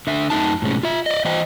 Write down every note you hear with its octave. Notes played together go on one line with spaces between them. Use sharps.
D3 E5
F#2 A3 D#4 A5
A2 C3 G#3 C#4
F4 E5
D5 D#5
E3 C5 D#5 G5